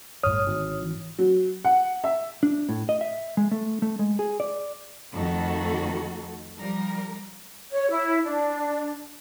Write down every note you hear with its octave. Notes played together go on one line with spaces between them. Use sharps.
G1 A2 C#5 D#6 F6
G#1 D3
E3
F#3
F#5
E5
D4
A2
D#5
E5
G#3
A3
A3
G#3
G#4
D5
F2 D#3 A3 F#4 A4
F3 G3 A#4
C#5
E4
D4